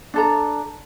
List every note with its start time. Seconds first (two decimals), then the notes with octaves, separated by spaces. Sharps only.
0.14 D4 A4 A#5